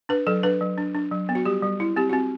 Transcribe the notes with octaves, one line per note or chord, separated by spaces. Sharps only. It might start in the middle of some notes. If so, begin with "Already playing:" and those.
D4 B4
F#3 A4
D4 B4
F#3
D4
D4
F#3
B3
F#4
G3 G4
G3
E4
C4 G4
C4 F#4